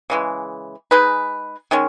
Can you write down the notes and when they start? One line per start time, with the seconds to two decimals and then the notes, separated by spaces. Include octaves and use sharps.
0.10 C#3 E3 G#3
0.91 G#3 D#4 G#4 B4
1.71 D#3 G#3 C#4